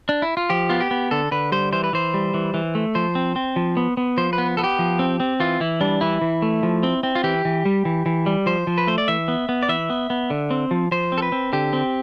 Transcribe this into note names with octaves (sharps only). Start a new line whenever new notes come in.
D4
E4
F4
F3 G4
B3 F4
G4
B3
D3 A4
D3 B4
G3 C5
E3 C5
B4
E3 C5
G3
E3
E3
A3
F3 C5
C4
C4
F3
B3
B3
F3 C5
B4
B3
B3 A4
G4
F3
C4
C4
E3 F4
E3 E4
G3 D4
E3 E4
E3
A3
F3
C4
C4
F4
E3 G4
E3
G3
E3
E3
G3
F3 C5
F3
B4
A3 C5
D5
E3 E5
B3
B3
D5
E3 E5
B3
B3
D3
C4
F3
F3 C5
C4
A4
B4
C4
D3 G4
C4